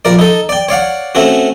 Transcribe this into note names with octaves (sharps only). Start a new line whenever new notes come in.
A#1 A#4 D5
D#4 A4
D5 G5
C#5 D5 F5 F#5
A3 C4 C#4 F#4